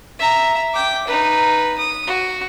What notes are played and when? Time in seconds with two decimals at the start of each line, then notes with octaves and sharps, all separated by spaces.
0.19 E5 A#5
0.74 G5 D6
1.07 D#4 B4
1.78 D#6
2.07 F#4